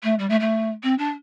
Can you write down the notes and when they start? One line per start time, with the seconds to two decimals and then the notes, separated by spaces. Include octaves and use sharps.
0.03 A3
0.19 G3
0.29 A3
0.40 A3
0.83 C4
0.98 D4